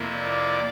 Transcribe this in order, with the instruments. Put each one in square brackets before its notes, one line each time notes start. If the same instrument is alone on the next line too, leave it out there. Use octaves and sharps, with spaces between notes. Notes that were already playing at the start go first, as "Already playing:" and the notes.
Already playing: [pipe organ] F2 C3 F3 A#3 E4
[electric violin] D5